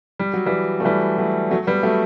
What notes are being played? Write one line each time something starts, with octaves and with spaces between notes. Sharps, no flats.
G3
F#3
E3 G3
A3
E3 G3
F#3 A3
F#3 A3
G3 B3
F#3 A3